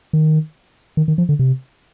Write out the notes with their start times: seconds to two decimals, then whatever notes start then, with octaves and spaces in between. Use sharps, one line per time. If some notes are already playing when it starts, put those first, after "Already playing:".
0.13 D#3
0.97 D#3
1.08 D#3
1.18 F3
1.29 D3
1.39 C3